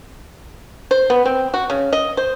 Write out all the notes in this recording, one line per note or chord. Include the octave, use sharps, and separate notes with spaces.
C5
B3
C4
F#4
C#3
D#5
C5